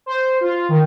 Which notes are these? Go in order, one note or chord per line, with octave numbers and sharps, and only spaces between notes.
C5
F4
D#3